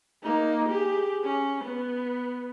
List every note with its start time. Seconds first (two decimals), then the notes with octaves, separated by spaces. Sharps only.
0.23 A#3 D#4
0.69 G4 G#4
1.23 C#4
1.64 B3